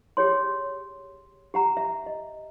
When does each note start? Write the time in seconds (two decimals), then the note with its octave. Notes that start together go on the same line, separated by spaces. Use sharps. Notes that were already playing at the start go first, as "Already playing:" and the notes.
0.17 G4 G#4 C#5 C6
1.54 G4 F#5 A#5
1.77 E5
2.06 D#5